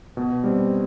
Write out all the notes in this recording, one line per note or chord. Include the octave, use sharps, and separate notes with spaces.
B2
G3 C4